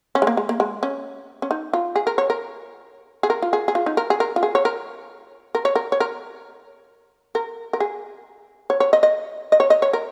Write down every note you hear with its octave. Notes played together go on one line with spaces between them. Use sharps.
C#4
G#3
A#3
G#3
A#3
G#3
C#4
C#4
D#4
F4
G#4
A#4
C#5
A#4
G#4
A#4
F4
G#4
G#4
F4
D#4
A#4
G#4
A#4
F4
G#4
C#5
A#4
A#4
C#5
A#4
C#5
A#4
A#4
A#4
G#4
C#5
C#5
D#5
D#5
D#5
C#5
D#5
C#5
A#4